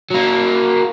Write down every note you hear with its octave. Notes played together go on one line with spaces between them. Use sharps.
F#3 A#3